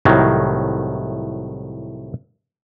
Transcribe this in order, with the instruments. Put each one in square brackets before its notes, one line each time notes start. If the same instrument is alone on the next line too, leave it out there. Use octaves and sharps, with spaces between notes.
[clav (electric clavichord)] C2 A2 D#3 F#3